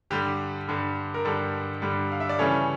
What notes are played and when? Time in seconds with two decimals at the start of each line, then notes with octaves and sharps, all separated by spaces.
0.10 G2 D3 G3 G4
0.68 G2 D3 G3
1.14 A#4
1.25 G2 D3 G3 A4
1.82 G2 D3 G3
2.12 F5
2.20 E5
2.29 D5
2.39 C#3 E3 G3 C#4 A4 C#5